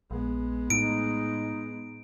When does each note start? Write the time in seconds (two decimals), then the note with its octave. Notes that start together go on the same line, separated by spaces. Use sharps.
0.11 A#1 G#3 B3
0.70 A2 D#4 D7